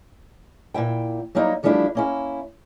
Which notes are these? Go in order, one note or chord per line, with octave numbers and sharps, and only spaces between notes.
A#2 F3 E4 G5
F#3 G3 A#3 D#4 E4
E3 F3 G3 A3 D4 E4
A#3 C#4 E4